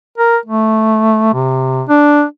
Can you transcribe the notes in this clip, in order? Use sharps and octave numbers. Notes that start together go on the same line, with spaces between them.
A#4
A3
C3
D4